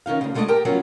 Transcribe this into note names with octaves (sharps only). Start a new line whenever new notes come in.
D#3 C#4 D#4 F5
D2 C#3
D2 G#3 A3 D4 D5 D#5
G4 A#4 G5 A5
F3 F#3 B3 C#4 A#4